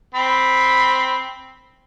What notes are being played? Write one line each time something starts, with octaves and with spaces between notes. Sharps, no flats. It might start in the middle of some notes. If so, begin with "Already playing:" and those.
C4 B5